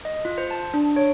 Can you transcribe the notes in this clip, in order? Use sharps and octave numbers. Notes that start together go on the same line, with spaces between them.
D#5
F4
C5
A5
D4
C#5